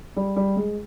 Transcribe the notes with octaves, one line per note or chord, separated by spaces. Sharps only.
G3
G3
G#3